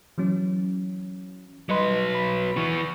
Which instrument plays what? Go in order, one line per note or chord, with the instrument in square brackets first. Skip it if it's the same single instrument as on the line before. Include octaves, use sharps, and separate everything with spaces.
[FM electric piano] E3 F#3 C#4
[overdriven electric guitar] F#3 B4 [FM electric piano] G3 D#5 C6
[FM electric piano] B5 B6
[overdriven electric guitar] E3 B3 [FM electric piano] C#6